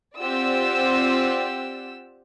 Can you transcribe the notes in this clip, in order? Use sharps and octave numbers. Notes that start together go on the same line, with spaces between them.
C4 F4 G4 D5 F#5 E6